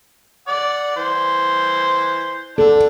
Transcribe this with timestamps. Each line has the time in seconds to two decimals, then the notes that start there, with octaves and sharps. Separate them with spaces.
0.48 D5 F#5 D6
0.96 E3 C5
2.58 D3 D4 A4